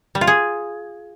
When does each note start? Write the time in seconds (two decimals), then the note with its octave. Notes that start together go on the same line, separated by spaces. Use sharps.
0.15 G3
0.21 F4
0.27 G#4